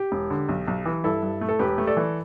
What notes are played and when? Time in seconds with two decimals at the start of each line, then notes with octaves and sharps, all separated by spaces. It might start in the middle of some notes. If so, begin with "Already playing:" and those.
Already playing: G4
0.12 E1
0.30 D3
0.49 B1
0.68 B1
0.86 E3
1.04 G2 E4 A4
1.23 G2
1.41 A3
1.49 A4
1.59 E1 G4 B4
1.78 A3
1.87 A4 D5
1.97 E3